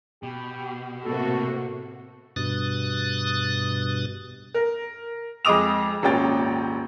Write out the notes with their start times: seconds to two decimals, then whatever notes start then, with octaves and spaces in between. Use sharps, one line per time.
0.23 B2 G4
1.05 A2 C3 A#3 F#4 A4
2.36 G2 B2 D#6 F#6 A6
4.54 A#4
5.45 F2 G#3 D#5 D6 D#6 F7
6.02 D#1 G#1 C#4 G5 A6